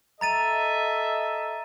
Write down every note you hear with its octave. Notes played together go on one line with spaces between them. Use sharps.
A4 D#5 E5 A#5 A6 D#7